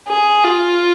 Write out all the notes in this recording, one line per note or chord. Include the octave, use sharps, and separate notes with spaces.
G#4
F4